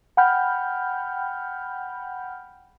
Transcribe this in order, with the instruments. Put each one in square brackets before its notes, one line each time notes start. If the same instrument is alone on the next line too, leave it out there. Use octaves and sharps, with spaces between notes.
[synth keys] F#5 G5 B5 F6 G6